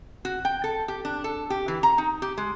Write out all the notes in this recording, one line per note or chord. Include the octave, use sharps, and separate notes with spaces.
F#4
G5
A4
G4
D4
A4
G4
E3
A#5
D#4
G4
G#3